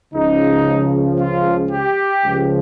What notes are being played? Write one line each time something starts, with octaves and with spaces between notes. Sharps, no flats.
C#2 C#3 F3 D#4
F4
G4
C#2 C#3 F3